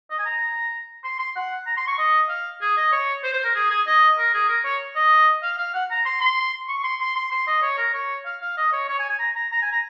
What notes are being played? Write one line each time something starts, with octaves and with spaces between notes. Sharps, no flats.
D#5
G#5
A#5
C6
C6
F#5
A#5
C6
C#6
D#5
F5
G#4
D#5
C#5
C5
C5
A#4
G#4
G#4
D#5
A#4
G#4
A#4
C#5
D#5
F5
F5
F#5
A#5
C6
C6
C#6
C6
C6
C6
C6
D#5
C#5
A#4
C#5
F5
F5
D#5
C#5
C#5
G#5
G#5
A#5
A#5
A#5
G#5
A#5